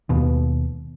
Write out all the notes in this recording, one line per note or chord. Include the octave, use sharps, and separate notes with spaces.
D#2 B2